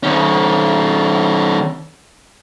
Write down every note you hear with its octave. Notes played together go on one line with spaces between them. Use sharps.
D#3 C#4